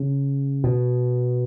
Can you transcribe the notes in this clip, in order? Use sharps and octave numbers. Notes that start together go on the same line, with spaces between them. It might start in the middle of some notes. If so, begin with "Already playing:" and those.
Already playing: C#3
B2